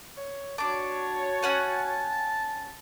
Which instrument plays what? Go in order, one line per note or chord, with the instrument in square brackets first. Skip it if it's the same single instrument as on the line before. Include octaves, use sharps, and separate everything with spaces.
[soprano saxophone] C#5
[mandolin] D4 D6 [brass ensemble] F#4 C#5 [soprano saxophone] A5
[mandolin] C#4 F#5 G#5